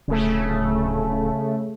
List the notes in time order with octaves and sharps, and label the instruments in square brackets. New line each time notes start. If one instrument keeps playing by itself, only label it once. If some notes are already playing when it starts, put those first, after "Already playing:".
[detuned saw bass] D1 [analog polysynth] C#3 A3